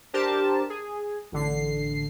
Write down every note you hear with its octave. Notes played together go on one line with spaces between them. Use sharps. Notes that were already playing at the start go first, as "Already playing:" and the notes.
D4 G4 A#4 C5 A5
G#4
A1 D3 C7